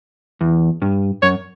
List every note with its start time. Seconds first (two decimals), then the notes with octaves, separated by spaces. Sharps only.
0.41 E2
0.82 G2
1.22 F#2 C#5